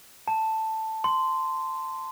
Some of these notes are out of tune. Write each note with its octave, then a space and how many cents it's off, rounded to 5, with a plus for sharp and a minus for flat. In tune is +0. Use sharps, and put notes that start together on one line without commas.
A5 +5
C6 -10